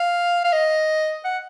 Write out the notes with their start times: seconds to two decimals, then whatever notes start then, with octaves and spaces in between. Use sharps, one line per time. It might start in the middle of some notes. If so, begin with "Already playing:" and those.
Already playing: F5
0.45 F5
0.53 D#5
1.25 F#5